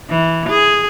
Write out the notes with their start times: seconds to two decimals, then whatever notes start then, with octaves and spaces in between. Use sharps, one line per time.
0.10 E3
0.49 G#4